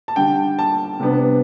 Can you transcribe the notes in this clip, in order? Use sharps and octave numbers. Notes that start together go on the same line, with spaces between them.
A5
D3 G3 D4 G5
A5
C3 G3 B3 D4